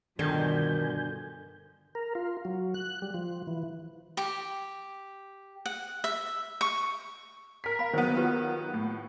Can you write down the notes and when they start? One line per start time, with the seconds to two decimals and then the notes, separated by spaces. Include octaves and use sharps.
0.19 G2 B2 D3 D#3 F3 G#5 G6
1.95 A#4
2.15 F4
2.45 F#3
2.74 F#6
3.02 G3
3.14 F3
3.47 E3
4.17 G4
5.66 F#5
6.04 E5
6.61 C#6
7.64 A#4 B6
7.79 F5 B5
7.93 D#3 F#3 B3 C5
8.17 F4 G4 B4
8.74 A2